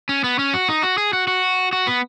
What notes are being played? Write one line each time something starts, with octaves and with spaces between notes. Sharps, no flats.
C#4
B3
C#4
F#4
D#4
F#4
G#4
F#4
F#4
F#4
B3